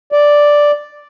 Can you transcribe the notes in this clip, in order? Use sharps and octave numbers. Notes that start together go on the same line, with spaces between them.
D5